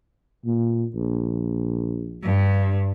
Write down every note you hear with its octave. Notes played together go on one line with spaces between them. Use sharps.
A#2
A#1
G2